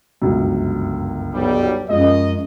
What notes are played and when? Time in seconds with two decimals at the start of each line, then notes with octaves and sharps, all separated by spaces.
0.22 G1 C#2 F#2
1.34 B1 G3
1.90 F#2 F3 G#3 D#5